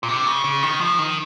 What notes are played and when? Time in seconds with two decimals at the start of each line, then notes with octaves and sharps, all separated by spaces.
0.03 A#2
0.08 C3
0.26 C#3
0.44 C#3
0.63 D#3
0.81 F3
0.98 D#3